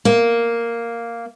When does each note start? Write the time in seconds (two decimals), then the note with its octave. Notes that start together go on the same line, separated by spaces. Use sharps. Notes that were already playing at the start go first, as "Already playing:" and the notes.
0.05 A#3